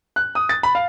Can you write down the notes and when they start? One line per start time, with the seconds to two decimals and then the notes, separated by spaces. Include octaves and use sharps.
0.16 F#6
0.35 D#6
0.49 A6
0.63 B5
0.75 F5